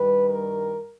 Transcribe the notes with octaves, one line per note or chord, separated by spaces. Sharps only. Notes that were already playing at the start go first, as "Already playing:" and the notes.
Already playing: G2 D#3 G3 B4
A#4